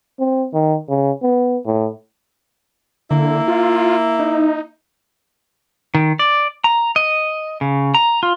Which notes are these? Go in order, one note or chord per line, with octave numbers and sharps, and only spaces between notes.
C4
D#3
C#3
B3
A2
D3 A#3 E4
F4
D#4
D#3
D5
A#5
D#5
C#3
A#5
F4